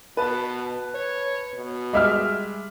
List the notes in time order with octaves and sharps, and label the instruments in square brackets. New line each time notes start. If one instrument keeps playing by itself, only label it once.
[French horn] B2 [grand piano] B4 A5
[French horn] C#5
B2
[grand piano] G3 G#3 D6 [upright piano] D#5 E5 F6